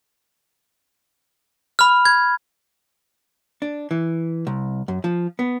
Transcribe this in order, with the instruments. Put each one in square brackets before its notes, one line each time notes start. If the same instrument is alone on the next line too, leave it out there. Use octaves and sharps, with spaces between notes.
[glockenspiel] B5 F6
G#6
[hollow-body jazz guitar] D4
E3
C2
F#2
F3
B3